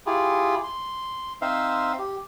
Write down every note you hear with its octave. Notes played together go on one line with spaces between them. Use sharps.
E4 F4 G4 G#4
C6
C4 D#4 C5 E5 F5
G4